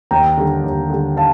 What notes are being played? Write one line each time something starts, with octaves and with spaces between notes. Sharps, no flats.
D#2 G5 A#5
D3 G3
D#2
D3 G3
F5 A5